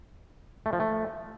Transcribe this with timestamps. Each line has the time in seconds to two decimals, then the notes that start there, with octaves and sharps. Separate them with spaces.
0.66 A3
0.73 F3
0.80 A3